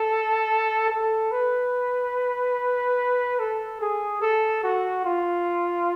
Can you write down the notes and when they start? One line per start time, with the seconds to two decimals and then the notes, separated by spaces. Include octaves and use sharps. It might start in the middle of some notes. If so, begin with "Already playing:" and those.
Already playing: A4
0.90 A4
1.31 B4
3.39 A4
3.81 G#4
4.21 A4
4.63 F#4
5.05 F4